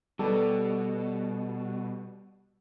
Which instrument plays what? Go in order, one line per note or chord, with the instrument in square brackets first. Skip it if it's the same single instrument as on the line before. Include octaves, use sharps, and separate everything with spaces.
[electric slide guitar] B2 [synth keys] G3 [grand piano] A4 B4